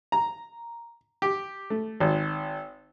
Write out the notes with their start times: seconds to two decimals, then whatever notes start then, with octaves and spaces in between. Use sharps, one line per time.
0.12 A#5
1.22 G4
1.70 A3
2.00 G#1